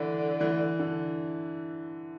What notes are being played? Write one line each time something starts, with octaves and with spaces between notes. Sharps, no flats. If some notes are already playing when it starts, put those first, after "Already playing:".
Already playing: D3 E3
E3
D3